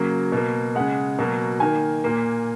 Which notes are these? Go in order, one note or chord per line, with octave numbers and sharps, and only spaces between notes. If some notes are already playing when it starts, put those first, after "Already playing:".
Already playing: C#3 F#3 A#3
B2 A#3
C#3 G#3 F#5
B2 F#3 A#3
D#3 A#3 G#5
A#2 A#3